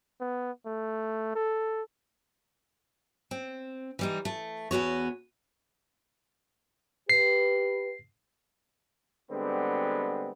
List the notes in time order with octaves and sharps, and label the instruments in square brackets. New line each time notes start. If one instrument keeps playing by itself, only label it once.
[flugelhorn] B3
A3
A4
[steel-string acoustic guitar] C4
E3 G3 D#4
A3
E2 B3 F#4 C#5
[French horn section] G4 B4 [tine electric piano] C7
[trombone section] D3 G3 G#3 B3 C4